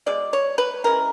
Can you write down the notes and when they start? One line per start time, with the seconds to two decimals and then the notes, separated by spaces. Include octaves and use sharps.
0.06 B2 G#3 D5
0.33 C#5
0.58 B4
0.84 E3 G#3 C#4 A#4